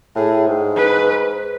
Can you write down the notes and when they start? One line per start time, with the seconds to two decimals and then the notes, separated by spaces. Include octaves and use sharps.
0.16 A2 G#4
0.46 G#2
0.77 B4